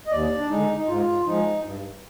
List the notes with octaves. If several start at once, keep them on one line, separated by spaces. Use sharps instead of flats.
D#5
D#2 D5
D4
D3 G#3 D#4
D#4
G#2 F4
F3 G#3 D#4
G2